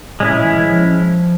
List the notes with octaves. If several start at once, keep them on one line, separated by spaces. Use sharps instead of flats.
A2 G#3 C#4 E4
A#2
E3
E3
F3